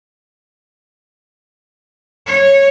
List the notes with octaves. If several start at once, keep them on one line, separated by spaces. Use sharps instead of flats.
C#5